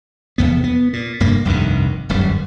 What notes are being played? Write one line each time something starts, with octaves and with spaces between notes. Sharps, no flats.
F1 E2 B3
B3
A#2
F1 G2 A#3
F1 C2 G2 D#3
D1 G1 F#2 G3